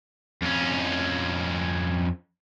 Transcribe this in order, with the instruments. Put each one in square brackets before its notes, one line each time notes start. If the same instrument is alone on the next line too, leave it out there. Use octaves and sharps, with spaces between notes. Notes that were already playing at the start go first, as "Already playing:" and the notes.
[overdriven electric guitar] F2 C#4